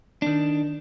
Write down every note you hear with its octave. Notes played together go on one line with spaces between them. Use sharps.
D#3 D4